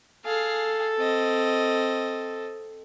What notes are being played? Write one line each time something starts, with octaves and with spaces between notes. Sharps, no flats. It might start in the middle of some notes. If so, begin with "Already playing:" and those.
G#4 A4 F5
C4 D#5